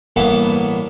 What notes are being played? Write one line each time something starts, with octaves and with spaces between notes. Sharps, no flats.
A1 G2 E3 A#3 B3 E5